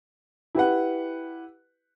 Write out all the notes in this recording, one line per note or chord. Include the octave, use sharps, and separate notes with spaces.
E4 G4 B4 F#5